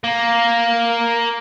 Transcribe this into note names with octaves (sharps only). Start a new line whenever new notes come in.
A#3